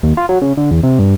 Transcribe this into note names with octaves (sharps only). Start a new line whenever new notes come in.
D#2
F4
F#3
C#3
D3
E2
C3
G2